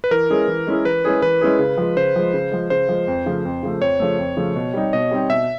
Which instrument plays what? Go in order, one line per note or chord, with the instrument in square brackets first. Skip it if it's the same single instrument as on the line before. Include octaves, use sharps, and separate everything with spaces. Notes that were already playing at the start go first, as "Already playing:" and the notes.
[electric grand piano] B4
[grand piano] E3 [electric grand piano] A#4
[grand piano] G#3 C#4 E4 G#4
E3
G#3 C#4 E4 G#4
[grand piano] E3 [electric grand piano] B4
[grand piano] G#3 C#4 E4 G#4
[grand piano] E3 [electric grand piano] B4
[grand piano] G#3 C#4 E4 G#4
C#3
F3 G#3
[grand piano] C#3 [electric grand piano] C5
[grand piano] F3 G#3
C#3
F3 G#3
[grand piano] C#3 [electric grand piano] C5
[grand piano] F3 G#3
F2
C#3 F3 A3
F2
C#3 F3 A3
[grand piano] F2 [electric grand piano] C#5
[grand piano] C#3 F3 A3
F2
C#3 F3 A3
B2
G3 C4 D#4 G4
[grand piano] B2 [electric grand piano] D#5
[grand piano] G3 C4 D#4 G4
[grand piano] B2 [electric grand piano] E5